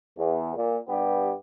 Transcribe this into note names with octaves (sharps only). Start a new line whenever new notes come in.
E2
A#2
G2 B3 G4